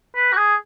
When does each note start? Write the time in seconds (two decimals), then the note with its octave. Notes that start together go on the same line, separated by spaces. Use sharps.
0.15 B4
0.32 F#4
0.37 G#4